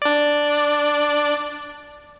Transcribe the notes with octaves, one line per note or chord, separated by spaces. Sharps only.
D4 D5